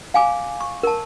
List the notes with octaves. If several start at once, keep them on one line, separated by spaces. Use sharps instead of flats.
F5 G#5 D6
C#6
A#4 A5